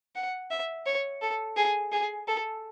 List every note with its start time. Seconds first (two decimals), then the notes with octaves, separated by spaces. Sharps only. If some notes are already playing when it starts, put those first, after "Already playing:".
0.15 F#5
0.51 E5
0.86 C#5
1.22 A4
1.57 G#4
1.92 G#4
2.28 A4